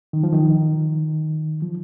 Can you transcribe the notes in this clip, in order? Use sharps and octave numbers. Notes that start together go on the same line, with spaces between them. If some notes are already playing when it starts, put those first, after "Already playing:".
D#3
F3
D#3
F3